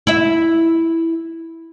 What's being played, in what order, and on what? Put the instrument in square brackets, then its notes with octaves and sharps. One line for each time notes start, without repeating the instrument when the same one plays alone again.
[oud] E4 E5